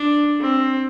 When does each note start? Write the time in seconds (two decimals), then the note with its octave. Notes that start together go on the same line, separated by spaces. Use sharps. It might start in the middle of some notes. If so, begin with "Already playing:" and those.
Already playing: D4
0.40 C4